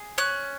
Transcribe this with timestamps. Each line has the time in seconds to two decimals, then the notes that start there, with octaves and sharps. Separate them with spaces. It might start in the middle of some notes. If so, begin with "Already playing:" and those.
Already playing: G#4
0.18 C#4 F#6